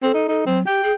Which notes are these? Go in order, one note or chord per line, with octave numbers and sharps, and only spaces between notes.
C4 A4
D#4
D#4 A4
F#3 C4
G4 G5
G#4